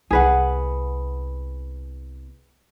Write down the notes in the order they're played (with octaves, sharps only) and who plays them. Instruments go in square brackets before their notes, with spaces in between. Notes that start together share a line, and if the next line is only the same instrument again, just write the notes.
[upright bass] C2 B3 [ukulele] G#4 B4 F#5